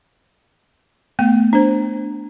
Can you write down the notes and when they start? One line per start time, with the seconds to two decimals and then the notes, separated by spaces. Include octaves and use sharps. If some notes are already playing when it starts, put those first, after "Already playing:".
1.19 A3 B3 G5
1.53 D4 C5